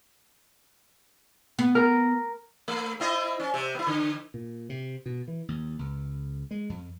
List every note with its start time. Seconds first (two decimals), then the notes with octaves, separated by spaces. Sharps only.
1.59 B3
1.75 A#4
2.68 A3
3.00 C4 E4 D#5
3.40 C#4
3.54 C3
3.75 B3 E4
3.87 D3
4.34 A#2
4.69 C3
5.06 B2
5.28 E3
5.48 D#2
5.79 C#2
6.51 G#3
6.69 F2